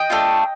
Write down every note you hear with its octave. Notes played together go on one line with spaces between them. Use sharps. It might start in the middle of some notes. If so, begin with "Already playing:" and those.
Already playing: D#5 G5
A3 D4 F4